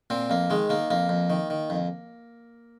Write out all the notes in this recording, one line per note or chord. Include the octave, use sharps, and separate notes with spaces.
A#2 C4
F2 A#3
D#3 G#3
D#3 A#3
F2 A#3
F2
D#3
D#3
F2